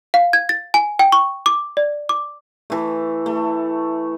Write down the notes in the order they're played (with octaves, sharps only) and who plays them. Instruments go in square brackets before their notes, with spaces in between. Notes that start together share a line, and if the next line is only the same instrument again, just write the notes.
[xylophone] F5
G#6
A6
G#5
G5
C#6
D6
D5
D6
[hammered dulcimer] E3 A3
A3